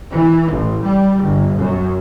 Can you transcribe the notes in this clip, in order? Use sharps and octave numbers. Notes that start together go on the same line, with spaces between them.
E3
A1
G3
G1
F#2